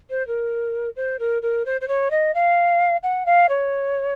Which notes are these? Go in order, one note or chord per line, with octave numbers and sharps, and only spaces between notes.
C5
A#4
C5
A#4
A#4
C5
C5
C#5
D#5
F5
F#5
F5
C#5